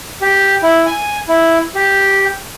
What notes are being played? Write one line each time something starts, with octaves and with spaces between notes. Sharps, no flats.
G4
E4
G#5
E4
G4